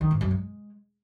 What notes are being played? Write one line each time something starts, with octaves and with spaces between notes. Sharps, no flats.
D#3
G#2
F#2
G#3